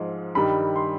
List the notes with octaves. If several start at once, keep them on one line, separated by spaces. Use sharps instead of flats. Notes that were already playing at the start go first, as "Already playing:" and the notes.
Already playing: G#2 F3 G#3
G2 D#3 G3 B5
C6